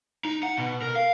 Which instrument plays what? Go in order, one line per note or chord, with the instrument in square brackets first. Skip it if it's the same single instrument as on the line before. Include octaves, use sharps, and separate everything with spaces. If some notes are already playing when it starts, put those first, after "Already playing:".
[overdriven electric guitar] D#4
F#5
B2
A#4
F5